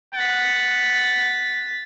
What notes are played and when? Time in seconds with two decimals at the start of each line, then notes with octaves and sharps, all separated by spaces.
0.15 F#5 A6 B6